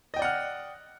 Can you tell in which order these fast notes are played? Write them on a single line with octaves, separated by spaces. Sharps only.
D#5 G5 D5 F#5 F6